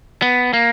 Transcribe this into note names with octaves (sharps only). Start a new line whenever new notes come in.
B3
A#3